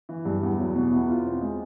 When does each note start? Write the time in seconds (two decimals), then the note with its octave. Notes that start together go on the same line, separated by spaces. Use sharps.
0.09 E3
0.25 G2
0.43 E2
0.59 F#3
0.75 B2
0.92 E2
1.09 F4
1.25 C4
1.41 G#3